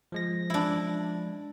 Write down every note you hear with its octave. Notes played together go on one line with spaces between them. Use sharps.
F3 G#3 A#6
D4 E4